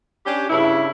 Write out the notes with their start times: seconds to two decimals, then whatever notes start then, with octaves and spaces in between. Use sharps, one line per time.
0.25 C#4 D4 G4
0.49 G2 C#3 E4